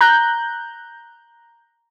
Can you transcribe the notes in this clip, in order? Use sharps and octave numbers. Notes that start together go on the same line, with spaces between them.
A#5 F#6 G6